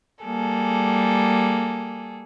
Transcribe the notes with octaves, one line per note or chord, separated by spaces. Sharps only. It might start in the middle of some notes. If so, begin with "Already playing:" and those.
G3 A#3 G#4 A4